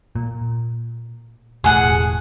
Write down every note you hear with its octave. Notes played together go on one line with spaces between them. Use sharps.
A#2
E1 A2 G#4 F#5